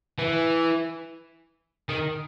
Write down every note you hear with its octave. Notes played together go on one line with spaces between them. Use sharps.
E3
D#3